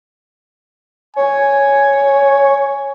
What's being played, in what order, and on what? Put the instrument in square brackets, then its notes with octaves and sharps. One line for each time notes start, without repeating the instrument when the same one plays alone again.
[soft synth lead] C#5 [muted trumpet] G#5